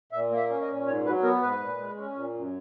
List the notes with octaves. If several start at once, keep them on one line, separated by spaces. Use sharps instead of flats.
A#2 E5
A#3
E5
C#4
D#5
A#2
G#2 C#5
F#3 B4
B3 A#4
G#2 B4
A#2
G#3
C#4
A#2
F#2